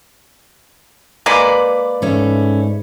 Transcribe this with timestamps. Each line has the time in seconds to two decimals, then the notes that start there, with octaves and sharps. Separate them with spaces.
1.26 G#3 A#3 B4 D5
2.02 G#2 A3 C#4